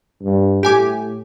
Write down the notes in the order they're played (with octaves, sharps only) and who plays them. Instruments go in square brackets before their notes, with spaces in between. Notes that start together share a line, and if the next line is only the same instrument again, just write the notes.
[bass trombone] G2
[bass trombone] A2 [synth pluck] G4 G#5 D6